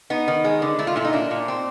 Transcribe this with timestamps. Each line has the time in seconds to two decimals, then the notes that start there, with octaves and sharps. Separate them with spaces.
0.10 B3 D#4
0.28 D#3
0.44 G#3
0.62 D3
0.79 A3 E4
0.87 F4
0.96 A#2 E4
1.05 D#4
1.13 A#3 D4
1.31 A#2
1.48 C4